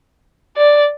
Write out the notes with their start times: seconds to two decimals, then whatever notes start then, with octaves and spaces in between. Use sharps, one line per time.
0.57 D5